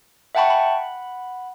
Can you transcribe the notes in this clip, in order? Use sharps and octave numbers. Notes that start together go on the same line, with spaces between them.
E5 F#5 G5 A5 B5 C#6
F#5 B5